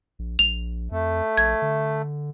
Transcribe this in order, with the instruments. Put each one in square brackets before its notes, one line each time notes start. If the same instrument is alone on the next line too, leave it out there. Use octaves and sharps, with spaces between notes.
[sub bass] A#1
[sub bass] A#1 [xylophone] F7
[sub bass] F2 [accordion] A3
[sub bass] A#1 [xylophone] G#6
[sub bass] D3